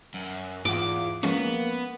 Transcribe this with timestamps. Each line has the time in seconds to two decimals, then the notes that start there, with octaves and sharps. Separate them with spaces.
0.14 F#2
0.65 E2 G#2 F4 F#5 D6
1.23 F3 G#3 A#3 B3 C#4